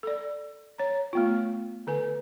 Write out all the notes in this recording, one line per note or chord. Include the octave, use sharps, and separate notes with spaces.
A4 D5
C#5 A#5
A3 B3 F4
D3 B4 G#5